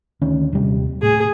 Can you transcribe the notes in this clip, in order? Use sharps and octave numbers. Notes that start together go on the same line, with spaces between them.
D2 D#3 C#4
D#1 C3 G3
A2 G#4